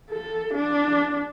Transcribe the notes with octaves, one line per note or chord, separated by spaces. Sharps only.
A4
D4